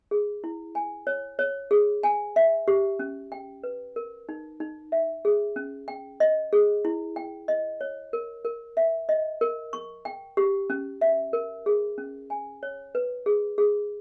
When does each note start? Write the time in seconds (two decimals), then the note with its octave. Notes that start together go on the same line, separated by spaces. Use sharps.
0.11 G#4
0.44 E4
0.75 G#5
1.07 C#5
1.39 C#5
1.71 G#4
2.03 G#5
2.36 E5
2.68 G4
2.99 C#4
3.32 G5
3.64 B4
3.96 A#4
4.29 D#4
4.60 D#4
4.92 E5
5.25 G#4
5.56 C#4
5.88 G5
6.20 D#5
6.53 G#4
6.85 E4
7.16 G5
7.48 D#5
7.81 C#5
8.13 A#4
8.45 A#4
8.77 E5
9.09 D#5
9.41 A#4
9.73 C#6
10.05 G5
10.37 G4
10.70 C#4
11.01 E5
11.33 A#4
11.66 G#4
11.98 C#4
12.30 G#5
12.63 C#5
12.95 B4
13.26 G#4
13.58 G#4